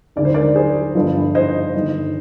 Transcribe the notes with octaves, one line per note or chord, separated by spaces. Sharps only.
D#2 D3 G#3 D5
C5
A#4 D5
G#4 C5
G1 G2 F3
C5 D#5
G1 G2 D#3